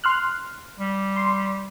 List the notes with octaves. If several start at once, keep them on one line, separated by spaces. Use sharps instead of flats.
C6 F6 F#6
G3
C6